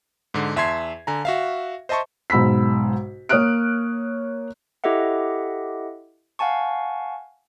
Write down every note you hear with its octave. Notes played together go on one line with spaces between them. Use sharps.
G#2 D3
E2 E5 A5 C6 G#6 C7
D3 G#5 A#5
F#4 E5 F5
C5 D#5 E5 A5 C6 C#6
B1 G#2 B5 E6 B6
A#3 C#5 D#6 F6 F#6 D7
E4 G4 A4 D#5 E5 F#5
F5 F#5 G#5 A5 C#6